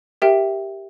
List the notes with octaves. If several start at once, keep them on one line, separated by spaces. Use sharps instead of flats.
G4 A#4 E5 G5